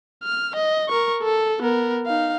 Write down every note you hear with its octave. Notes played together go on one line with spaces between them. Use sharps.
F6
D#5
A#4 C#6
A4
B3 A#4
D#4 F5